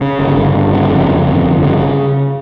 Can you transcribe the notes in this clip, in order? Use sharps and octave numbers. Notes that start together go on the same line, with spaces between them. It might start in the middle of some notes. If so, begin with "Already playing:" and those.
C#3
G1
G1
G1
C#3
F2
F2
G1
G1
C#3